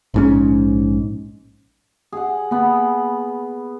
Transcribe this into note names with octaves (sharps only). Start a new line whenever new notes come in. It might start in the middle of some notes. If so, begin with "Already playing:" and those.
A#1 G#2 C#4
G#4 F#5
A#3 B3 B5